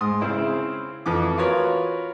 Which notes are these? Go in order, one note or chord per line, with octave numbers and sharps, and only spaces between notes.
G#2 C6 D#6
C#3 C4 E4
F2 E3 D6
F4 F#4 A#4 B4 C#5